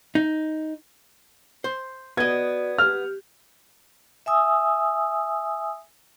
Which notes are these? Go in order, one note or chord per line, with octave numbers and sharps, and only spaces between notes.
D#4
C5
B3 F#4 D5 D#5 G#6
G4 F6
E5 G#5 D#6 E6